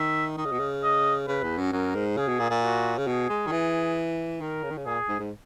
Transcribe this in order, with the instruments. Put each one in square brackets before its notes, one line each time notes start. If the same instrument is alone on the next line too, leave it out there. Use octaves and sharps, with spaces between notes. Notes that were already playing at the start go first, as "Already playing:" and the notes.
Already playing: [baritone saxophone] D#3 [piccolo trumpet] E5
[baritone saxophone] D#3 [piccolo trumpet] D#5
[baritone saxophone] C#3
B2
C#3
[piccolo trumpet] D#5
[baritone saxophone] C#3 [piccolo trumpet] B4
[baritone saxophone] E2
F#2
[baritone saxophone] F#2 [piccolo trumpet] A#4
[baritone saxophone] G#2
[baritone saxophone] C#3 [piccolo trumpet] G#4
[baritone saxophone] B2
A#2
A#2
[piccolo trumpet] F#4
[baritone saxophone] C#3
[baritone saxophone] B2 [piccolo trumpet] G#4
[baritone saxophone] G#3
D#3
E3
[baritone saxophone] D#3 [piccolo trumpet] A#4
[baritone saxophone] C#3
D#3
C#3
[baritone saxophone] A#2 [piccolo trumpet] G#4
[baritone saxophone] G#2
G#2